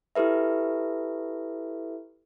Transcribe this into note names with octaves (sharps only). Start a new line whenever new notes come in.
E4 G4 A4 B4 E5